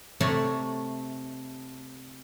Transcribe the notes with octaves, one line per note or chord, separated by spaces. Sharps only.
C3 A3 C#5 D5 A5 A#5